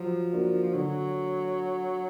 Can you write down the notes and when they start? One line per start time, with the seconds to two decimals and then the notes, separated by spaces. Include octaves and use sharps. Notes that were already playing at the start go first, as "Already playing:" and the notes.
Already playing: F3 F#3
0.33 A#3 D4 F#4 A#4
0.74 D3 F#3